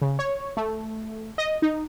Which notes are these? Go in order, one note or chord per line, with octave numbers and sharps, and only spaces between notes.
C#3
C#5
A3
D#5
D#4